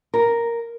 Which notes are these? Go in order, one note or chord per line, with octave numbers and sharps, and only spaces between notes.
A#4